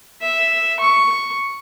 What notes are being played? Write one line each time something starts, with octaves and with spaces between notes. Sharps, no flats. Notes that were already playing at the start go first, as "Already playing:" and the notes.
E5
C#6